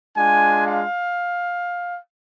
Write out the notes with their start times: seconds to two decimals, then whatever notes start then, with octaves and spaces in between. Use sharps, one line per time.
0.16 G#3 D4 F4 G#5
0.65 F5